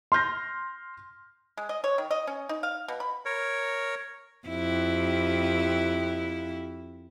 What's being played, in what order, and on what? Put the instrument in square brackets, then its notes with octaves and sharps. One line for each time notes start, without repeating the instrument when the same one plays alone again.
[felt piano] C6 F6 G6 A#6
[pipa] G#3
D#5
C#5
D#3
D#5
C#4
D#4
F5
B2
B5
[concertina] A#4 C#5
[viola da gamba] F2 E4 G4